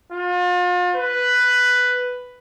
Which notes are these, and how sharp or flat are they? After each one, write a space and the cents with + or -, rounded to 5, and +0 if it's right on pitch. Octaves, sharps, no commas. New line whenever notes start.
F4 +40
B4 +5